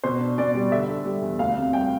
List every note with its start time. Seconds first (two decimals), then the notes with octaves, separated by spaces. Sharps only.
0.04 B2 C5
0.20 D4
0.38 B2 D5
0.55 G3
0.71 D3 E5
0.89 D3
1.05 G3
1.22 E2
1.39 D2 F5
1.57 C3
1.73 G3 G5